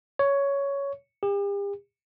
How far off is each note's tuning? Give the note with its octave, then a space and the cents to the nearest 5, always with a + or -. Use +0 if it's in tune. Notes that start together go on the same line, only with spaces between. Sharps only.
C#5 +10
G4 +40